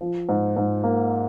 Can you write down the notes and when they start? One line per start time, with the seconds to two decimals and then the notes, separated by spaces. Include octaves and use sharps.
0.01 F3
0.29 G#2
0.56 G#2
0.84 A#3